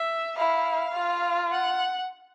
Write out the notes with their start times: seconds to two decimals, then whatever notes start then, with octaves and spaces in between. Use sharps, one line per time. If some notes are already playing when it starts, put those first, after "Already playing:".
Already playing: E5
0.38 E4 F5
0.94 F4
1.50 F#5